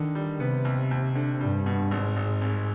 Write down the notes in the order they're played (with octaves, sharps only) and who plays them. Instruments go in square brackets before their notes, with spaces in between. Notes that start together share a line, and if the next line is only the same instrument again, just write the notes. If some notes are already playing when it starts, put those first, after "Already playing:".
Already playing: [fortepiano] D3 [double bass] D#3
[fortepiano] G3
[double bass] C3 [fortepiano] B3
[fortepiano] D#2
D#2
D3
[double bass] G2 [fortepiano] G3
[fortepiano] B2
[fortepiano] G#1 [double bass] G#2
[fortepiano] G#1
C2